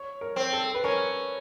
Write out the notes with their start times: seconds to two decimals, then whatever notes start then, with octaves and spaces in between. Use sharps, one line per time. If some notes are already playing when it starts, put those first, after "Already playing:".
Already playing: C#5
0.21 A#4
0.36 C4
0.53 A4
0.75 B4
0.84 C#4 A#4